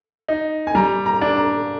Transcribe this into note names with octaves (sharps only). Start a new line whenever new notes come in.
D#4
G#5
G3 A#5
A#5
D4
A#5